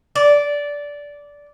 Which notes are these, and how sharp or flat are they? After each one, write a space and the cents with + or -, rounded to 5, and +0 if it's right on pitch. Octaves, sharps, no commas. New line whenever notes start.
D5 -15